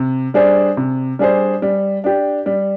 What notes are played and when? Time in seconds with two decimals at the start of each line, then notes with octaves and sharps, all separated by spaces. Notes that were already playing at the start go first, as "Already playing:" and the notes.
Already playing: C3
0.34 G3 D4 G#4 C5
0.77 C3
1.19 G3 D4 G#4 C5
1.62 G3
2.04 D4 G4
2.46 G3